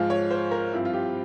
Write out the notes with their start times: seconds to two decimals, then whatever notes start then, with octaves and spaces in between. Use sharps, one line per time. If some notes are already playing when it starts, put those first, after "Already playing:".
Already playing: G#2 F3 G#3 F4
0.10 C#5
0.31 C5
0.51 A#4
0.72 G2 F3 C4 E4
0.85 F4
0.94 G4